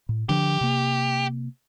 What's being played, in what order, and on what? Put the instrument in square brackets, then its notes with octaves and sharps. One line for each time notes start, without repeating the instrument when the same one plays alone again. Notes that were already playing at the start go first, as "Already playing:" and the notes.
[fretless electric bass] A2
[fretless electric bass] D3 F3 D4 [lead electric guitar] G4
[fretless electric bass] C3 A#3